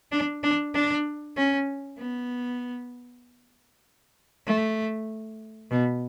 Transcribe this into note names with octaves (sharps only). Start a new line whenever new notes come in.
D4
D4
D4
C#4
B3
A3
B2